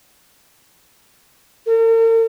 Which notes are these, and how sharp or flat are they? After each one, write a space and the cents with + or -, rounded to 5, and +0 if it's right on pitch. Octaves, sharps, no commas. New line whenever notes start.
A#4 -45